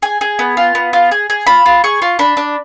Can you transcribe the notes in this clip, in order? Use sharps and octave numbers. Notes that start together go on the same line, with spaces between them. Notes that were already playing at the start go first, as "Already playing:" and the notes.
G#4 G#5
G#4
B3
F4
B3
F4
G#4
G#4
F4 B5
F4
G#4 C#6
F4
D4 B5
D4